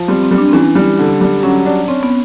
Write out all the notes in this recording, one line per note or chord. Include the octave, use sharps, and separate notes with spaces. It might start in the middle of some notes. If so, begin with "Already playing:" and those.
Already playing: F3
G3 C4
C4
G3
D4
C4
E3 C#4
G3
D3
G3
F#3 C#4
D4
C4 C#4
B3